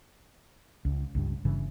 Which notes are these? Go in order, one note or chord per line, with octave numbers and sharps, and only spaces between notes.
C#2
C#2 G2
G1 G2 C#3 E3